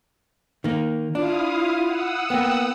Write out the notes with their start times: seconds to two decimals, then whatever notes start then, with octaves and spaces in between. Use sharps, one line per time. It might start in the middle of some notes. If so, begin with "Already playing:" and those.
0.64 D#3 A#3
1.15 D4 E4 F4 F5 D#6
1.81 F#5 D#6 E6
2.30 A#3 B3 G5